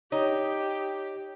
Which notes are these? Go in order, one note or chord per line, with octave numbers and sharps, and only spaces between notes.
D#4 G4 C#5